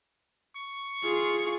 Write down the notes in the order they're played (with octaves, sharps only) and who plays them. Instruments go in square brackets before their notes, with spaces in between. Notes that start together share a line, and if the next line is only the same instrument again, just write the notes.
[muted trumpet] C#6
[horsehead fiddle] F4 G#4